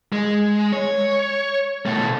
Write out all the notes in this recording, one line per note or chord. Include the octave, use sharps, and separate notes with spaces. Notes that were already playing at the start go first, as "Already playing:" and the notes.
G#3
C#5
B2 A3